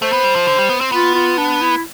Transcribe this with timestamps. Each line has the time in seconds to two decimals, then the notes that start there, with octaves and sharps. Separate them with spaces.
0.01 A3 C5
0.13 B3
0.24 G3
0.36 F3
0.47 D3
0.58 G3
0.69 B3
0.81 C4
0.92 B3 F4
1.15 F4
1.38 D4
1.61 E4